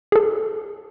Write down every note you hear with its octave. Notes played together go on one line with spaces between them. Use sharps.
G#4 A4